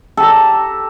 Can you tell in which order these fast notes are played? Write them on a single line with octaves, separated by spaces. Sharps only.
A4 G4 A#5